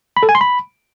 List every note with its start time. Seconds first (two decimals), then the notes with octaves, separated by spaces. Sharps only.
0.17 B5
0.23 A4
0.29 G#5
0.35 C6
0.41 B5